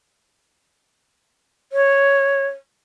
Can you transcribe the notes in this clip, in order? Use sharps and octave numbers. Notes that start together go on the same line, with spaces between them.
C#5